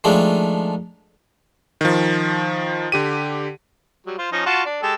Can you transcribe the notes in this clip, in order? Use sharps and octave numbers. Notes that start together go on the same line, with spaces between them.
D#3 F3 G#3 A3 D4
D#3 F3
D3 G4 D#7
F#3 G3
F4 C5
F3 C#4 D#4
F4 F#4 A5
D4
G#3 G4 A4